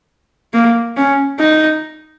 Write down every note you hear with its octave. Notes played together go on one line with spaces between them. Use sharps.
A#3
C#4
D#4